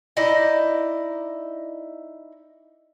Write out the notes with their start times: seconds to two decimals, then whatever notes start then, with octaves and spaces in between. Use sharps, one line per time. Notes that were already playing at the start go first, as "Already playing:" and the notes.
0.17 D#4 E4 D5 D#5